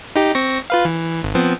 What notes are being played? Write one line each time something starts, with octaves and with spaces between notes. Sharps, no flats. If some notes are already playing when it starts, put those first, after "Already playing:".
D#4 G4
C4 C#6 A#6
F4 B4 F5
E3
G#1
F3 B3 C4